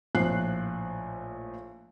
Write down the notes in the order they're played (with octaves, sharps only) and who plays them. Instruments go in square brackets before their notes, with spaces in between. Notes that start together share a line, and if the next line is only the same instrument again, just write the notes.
[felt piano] A#1 A2 F3 F#6 C7